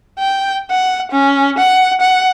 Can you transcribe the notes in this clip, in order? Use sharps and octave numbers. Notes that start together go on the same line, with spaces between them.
G5
F#5
C#4
F#5
F#5